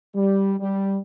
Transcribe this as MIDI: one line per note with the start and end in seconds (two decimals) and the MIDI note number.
0.14 0.55 55
0.60 0.97 55